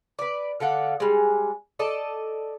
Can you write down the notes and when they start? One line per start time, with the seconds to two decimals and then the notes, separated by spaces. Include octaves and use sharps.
0.19 B4 D5
0.60 D3 A4 F5 F#5
1.00 G3 G#3
1.79 A4 D5 D#5 A5